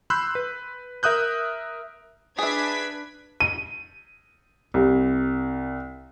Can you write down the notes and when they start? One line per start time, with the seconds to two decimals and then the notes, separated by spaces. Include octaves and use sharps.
0.10 B5 C6 E6 F#6 G6
0.35 B4
1.03 A#4 E5 D#6 F#6 G6
2.38 D4 G#4 B4 E5 G#6 B6
3.40 D#7
4.74 C2